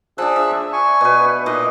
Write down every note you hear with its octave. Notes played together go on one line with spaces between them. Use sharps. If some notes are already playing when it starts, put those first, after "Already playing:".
F3 D4 G#4 E6 F#6
E5
G#5 C#6
B2 B4
A#2 D#4 D#5